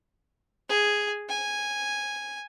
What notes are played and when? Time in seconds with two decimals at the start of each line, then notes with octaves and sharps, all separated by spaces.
0.69 G#4
1.29 G#5